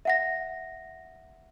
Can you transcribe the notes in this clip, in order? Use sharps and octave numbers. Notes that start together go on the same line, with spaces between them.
E5 F#5 A#6